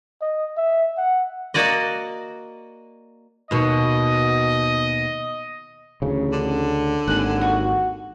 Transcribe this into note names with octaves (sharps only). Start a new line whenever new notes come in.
D#5
E5
F#5
A#3 F#4 D5 D#5
D#2 B2 D#5
A1 D2 C#3
D3
G#1 D#2 F#5 G#5
F#4